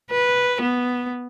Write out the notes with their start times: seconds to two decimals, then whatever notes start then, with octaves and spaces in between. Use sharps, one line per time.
0.11 B4
0.62 B3